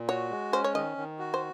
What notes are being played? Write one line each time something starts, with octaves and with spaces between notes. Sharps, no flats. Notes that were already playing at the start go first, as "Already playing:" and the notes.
Already playing: A#2
F#4 C#5
G#3
C#4 C5
C#5
D#3 D#5
D#3
F#4
C5